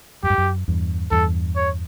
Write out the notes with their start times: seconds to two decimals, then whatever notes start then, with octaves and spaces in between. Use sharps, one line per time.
0.23 F#2 G4
0.30 G2
0.38 F#2
0.68 E2 G2
1.11 E2 G2 A4
1.56 C#5